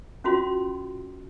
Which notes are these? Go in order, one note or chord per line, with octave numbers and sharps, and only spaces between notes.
C#4 F4 F#4 C6